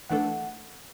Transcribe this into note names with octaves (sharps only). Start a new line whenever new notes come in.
E3 A3 D4 A4 F#5